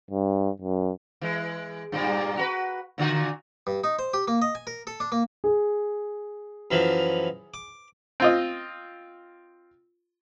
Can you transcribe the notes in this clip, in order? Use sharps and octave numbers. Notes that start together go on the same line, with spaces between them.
G2
F#2
E3 G#3
G2 A#2 G3
F#4 A#4 B4
A#2 D3 F#4
G2
D#4
C5
G4
A#3
D#5
G#5
A#4
A4
D4
A#3
G#4
F#2 E3 F3
D6
C4 F4 D#5